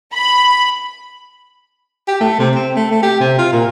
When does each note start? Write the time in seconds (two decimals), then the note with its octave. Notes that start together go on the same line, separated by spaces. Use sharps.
0.13 B5
2.08 G4
2.20 A3
2.39 C3
2.55 C4
2.76 A3
2.91 A3
3.03 G4
3.20 C3
3.38 F4
3.53 A#2